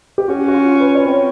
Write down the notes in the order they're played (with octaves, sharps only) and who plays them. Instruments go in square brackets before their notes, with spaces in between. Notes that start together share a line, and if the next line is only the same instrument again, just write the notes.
[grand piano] G4
[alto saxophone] C#4 [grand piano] F#4
[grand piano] F#4
F4
B4
C#5
[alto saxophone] C4 [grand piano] C5